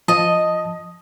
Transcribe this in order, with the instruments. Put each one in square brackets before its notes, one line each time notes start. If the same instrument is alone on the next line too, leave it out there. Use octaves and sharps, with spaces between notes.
[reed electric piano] F3 A5 [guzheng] D#5